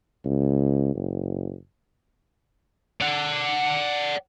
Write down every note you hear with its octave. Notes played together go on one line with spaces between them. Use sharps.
C#2
F#1
D5 F#5